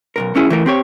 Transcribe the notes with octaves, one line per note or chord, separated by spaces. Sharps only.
B1 G2 A#4
B1 C#4 E4 G#4
E3 A3 A#4
C4 G4 C#5